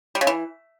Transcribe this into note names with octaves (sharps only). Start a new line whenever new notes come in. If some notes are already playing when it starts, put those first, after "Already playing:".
G3
C#3
E3